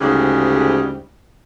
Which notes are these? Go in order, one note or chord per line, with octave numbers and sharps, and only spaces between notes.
D2 G#2 C#3 G3